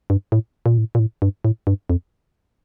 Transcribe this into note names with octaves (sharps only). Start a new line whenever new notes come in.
G2
A2
A#2
A2
A#2
A2
G2
A2
G2
F2